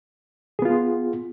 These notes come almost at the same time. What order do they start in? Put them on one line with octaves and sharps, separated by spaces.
G#4 B3 F4